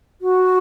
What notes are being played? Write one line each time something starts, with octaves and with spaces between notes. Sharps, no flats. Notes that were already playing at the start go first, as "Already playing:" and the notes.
F#4